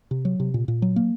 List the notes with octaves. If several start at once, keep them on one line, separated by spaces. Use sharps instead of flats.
C3
F#3
C3
A#2
A#2
F#3
A#3